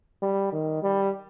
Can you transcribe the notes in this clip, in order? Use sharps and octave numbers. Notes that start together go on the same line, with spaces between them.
G3
D#3
G3